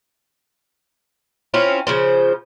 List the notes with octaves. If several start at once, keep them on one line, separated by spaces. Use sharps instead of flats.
C4 C#4 E4 F4
C#3 F3 C5